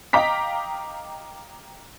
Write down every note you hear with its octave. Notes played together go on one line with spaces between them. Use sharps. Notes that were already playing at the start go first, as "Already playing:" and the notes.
D#5 F5 G5 A#5 D6 B6